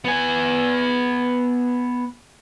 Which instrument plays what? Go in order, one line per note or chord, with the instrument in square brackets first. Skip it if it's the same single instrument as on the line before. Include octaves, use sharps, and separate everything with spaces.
[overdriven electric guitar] B3 G#5